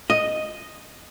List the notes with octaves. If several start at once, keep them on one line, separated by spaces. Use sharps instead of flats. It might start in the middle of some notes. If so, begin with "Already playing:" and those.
D#5